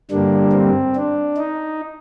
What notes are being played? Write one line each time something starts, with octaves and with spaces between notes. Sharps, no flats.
G2 D3 G3 A#3 D4
C4
D4
D#4